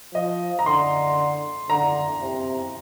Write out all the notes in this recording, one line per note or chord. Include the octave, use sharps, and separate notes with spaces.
F3 D#5
A#5
D3 C6
D3 A#5
C3